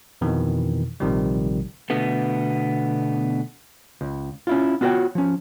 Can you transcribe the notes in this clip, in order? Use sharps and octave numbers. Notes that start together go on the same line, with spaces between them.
F2 B2 D#3 E3
A#1 C3 D#3 F3 G3
B2 D3 A3 B3
C#2
C#4 E4 F4
B3 F4 F#4 A#4 C#5 G5
F3 C#4